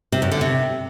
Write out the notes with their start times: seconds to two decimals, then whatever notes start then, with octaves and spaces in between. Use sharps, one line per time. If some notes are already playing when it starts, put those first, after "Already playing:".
0.12 C3
0.22 F#2
0.31 D3
0.41 C3